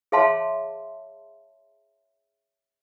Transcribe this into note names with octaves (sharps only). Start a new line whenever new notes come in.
G#4 C#5 E5 F5 A5 C6